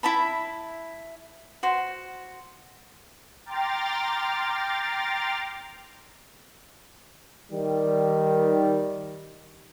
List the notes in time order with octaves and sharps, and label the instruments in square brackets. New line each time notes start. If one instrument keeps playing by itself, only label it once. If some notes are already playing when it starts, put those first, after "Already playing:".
[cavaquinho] E4 E5 A5 B5
F#4 C5
[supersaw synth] G5 A#5 C6 D6 F6 A6
[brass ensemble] D#3 G3